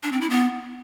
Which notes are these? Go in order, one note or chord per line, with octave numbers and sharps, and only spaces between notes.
D4
C4
E4
B3